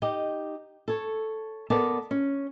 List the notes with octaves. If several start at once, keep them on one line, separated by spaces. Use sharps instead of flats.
D#4 G4 D#5
A4 C#5
B3 A4 A#4 D5 F#5 A5
C#4